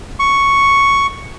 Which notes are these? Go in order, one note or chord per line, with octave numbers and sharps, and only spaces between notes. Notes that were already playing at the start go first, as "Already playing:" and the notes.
C#6